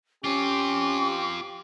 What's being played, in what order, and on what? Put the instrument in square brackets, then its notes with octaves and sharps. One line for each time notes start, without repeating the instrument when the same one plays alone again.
[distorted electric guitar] C4 F4 [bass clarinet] C#4 [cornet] G4 [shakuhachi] D6